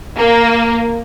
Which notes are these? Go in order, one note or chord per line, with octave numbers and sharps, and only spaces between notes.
A#3